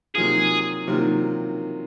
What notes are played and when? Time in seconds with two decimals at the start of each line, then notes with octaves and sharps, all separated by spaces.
0.15 C3 D#3 F#3 A#3 F4 G#4
0.87 C3 D#3 F#3 A#3 F4